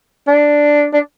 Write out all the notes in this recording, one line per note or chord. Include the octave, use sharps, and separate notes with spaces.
D4
D4